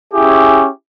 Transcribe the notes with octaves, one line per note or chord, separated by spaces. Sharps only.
C#4 E4 G4 G#4